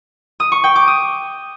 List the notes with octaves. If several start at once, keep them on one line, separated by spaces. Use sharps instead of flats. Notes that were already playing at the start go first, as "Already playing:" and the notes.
D#6
C#6
G5
D6
D#6